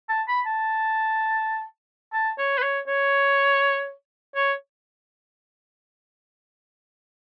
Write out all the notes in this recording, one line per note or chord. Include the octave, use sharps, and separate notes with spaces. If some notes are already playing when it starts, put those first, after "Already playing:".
A5
B5
A5
A5
C#5
B4
C#5
C#5
C#5